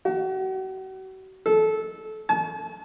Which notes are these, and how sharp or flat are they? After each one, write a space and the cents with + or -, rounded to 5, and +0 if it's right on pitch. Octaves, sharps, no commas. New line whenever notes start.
F#4 +40
A4 -20
A5 -45